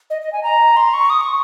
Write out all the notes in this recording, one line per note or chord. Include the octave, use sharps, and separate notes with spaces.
D#5
D#5
G#5
A#5
C6
C#6
D#6
C#6